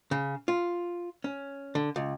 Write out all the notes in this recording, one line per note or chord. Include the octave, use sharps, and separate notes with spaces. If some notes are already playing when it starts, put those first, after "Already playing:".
C#3
F4
C#4
D3
C#2